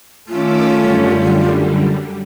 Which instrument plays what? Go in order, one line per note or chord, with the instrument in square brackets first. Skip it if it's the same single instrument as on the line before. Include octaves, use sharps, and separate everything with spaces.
[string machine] D#3 D6 E6 [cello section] A3 C#4 [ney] F4
[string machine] F#2 D3 G3